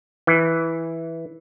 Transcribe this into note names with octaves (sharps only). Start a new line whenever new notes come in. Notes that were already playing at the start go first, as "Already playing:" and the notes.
E3